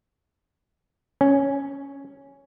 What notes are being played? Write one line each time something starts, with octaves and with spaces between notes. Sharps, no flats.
C#4